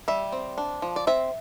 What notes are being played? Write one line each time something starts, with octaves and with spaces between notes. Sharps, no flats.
G3 E5
C4
D4
F3
D5
C4 E5